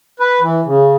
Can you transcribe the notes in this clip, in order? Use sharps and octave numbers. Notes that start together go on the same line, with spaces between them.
B4
E3
C#3